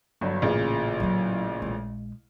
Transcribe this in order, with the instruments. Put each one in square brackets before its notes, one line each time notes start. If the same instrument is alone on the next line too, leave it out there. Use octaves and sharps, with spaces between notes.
[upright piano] G1 G2 F#3
A1 A#2 C#3
[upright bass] F#3 E4
A#1 G#3